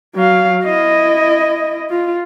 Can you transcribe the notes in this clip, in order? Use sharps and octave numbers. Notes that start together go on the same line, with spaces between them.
F#3 F5
E4 D#5
F4